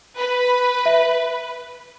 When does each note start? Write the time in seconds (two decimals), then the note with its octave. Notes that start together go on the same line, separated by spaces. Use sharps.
0.17 B4
0.86 E5